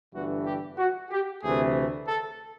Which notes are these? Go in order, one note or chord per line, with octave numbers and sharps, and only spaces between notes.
G1 G2 E3 A3 F#4
G4
F#4
G4
D2 C3 E3 A3 G#4
A4